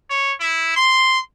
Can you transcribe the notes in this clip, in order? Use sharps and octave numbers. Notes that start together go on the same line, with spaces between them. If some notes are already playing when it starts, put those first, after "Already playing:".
C#5
E4
C6